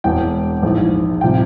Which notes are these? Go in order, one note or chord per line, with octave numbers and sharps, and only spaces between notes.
E1 E2 E3 G5
A#1 G#2 E3
C3 F3 G5